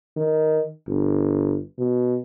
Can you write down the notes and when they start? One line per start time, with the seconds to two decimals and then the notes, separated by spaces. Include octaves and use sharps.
0.17 D#3
0.88 G1
1.78 B2